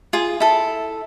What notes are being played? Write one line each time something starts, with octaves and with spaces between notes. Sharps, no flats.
F4 G#4
E4 A4